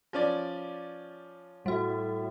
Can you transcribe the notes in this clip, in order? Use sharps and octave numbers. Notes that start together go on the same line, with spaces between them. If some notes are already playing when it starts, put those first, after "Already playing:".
F3 C#4 D5
A2 G3 F#4